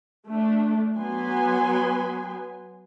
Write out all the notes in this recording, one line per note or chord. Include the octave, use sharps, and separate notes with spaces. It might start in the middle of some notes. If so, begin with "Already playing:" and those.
A3 D4
F#3 B3 B4 G#5 C6